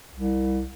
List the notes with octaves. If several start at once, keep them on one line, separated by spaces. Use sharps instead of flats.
C2